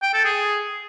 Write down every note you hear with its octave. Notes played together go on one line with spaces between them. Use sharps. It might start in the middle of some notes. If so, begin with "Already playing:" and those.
G5
A4
G#4